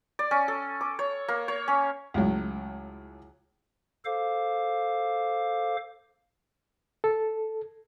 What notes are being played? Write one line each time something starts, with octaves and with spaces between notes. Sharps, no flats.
D5
C#4
A4
D6
C#5
A#3
C#5
C#4
C#2 A2 F#3
A4 C5 F5 D6
A4